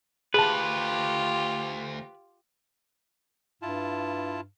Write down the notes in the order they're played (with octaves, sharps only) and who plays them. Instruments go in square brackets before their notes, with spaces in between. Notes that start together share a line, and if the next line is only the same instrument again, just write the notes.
[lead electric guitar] D2 G#2 [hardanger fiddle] F4 G4 [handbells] G#4 A5 [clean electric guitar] B4
[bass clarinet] G2 [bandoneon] E4 F4 A5